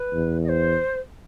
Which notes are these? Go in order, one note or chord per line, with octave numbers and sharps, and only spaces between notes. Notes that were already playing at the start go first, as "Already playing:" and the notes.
Already playing: B4
E2
D#5
C5